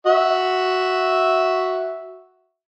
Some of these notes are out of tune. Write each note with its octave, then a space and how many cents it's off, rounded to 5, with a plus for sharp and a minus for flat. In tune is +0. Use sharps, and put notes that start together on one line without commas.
F#4 +0 E5 -5